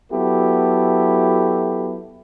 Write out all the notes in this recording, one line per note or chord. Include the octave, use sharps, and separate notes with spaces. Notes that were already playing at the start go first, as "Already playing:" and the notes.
F#3 B3 E4 F#4 G4 A4